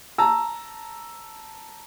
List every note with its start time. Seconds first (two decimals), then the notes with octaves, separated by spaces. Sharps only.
0.18 A5 A#5 E6